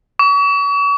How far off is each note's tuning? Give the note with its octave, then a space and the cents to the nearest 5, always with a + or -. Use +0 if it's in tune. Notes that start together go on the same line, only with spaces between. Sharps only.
C#6 +40